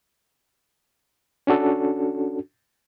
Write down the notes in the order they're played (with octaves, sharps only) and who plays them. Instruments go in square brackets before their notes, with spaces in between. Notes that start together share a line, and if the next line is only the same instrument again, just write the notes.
[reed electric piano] C#4 D4 F#4 A4